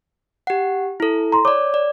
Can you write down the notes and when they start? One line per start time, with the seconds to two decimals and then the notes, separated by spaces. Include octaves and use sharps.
0.47 G4 F#5
1.00 E4 A4
1.32 A#5 C6
1.45 C#5 D5 D6
1.74 D5